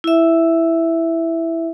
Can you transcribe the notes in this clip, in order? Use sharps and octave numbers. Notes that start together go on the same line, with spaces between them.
E4 E5